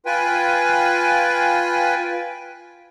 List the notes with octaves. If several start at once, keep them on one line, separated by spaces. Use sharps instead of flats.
F4 B4 G5 G#5